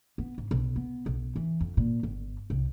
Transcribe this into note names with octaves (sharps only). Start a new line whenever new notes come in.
B3
G#2
B1
B3
B1
E3
F2
A#2
G1
C2